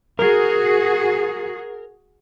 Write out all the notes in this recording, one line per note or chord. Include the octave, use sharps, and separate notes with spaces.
F#4 G#4 A#4